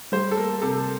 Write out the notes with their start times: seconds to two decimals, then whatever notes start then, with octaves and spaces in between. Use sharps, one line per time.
0.12 G3 C5
0.31 A4
0.37 A#3 A#4
0.62 C3 A4